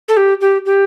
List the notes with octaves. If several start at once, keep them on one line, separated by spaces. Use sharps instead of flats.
A4
G4
G4
G4